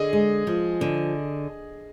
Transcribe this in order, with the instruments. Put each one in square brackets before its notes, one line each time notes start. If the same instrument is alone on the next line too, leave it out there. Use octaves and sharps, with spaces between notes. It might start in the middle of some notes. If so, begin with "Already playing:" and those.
Already playing: [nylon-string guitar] D3 [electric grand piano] G#4 D#5 G#5
[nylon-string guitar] G#3
F3
D3